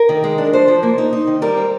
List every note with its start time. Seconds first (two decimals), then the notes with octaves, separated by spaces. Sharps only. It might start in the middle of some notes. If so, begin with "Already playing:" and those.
Already playing: A#4
0.09 D#3
0.24 G#3
0.38 D4
0.53 F3 C5
0.68 F3
0.83 A#3 C5
0.98 D#4
1.13 D#4
1.27 D#3
1.42 G3 A#4
1.57 C4